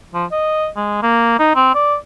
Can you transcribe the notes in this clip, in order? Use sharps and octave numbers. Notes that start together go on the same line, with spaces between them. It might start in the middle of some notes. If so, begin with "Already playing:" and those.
F3
D#5
G#3
A#3
D#4
C4
D5